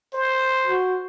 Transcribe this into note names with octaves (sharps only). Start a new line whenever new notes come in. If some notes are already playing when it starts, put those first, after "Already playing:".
C5
F#4